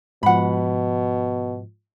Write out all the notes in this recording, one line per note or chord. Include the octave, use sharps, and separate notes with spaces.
G#2 B2 F3 F#5 B5